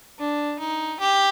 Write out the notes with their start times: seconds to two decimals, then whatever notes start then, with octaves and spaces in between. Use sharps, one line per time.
0.19 D4
0.59 D#4
1.00 G4